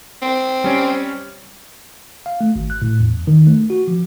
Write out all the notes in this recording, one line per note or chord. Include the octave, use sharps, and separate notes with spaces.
C4
G3 C#4
F5
A3
G#1
F#6
A2
E2
D#3
A3
F#4
F3